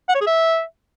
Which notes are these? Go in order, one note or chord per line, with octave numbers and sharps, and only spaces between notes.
F#5
C#5
G#4
E5